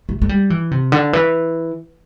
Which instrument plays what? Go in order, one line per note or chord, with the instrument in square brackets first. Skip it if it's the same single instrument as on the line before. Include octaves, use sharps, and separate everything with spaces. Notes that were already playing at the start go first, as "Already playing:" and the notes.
[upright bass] A3
A3
G3
E3
C3
D3
E3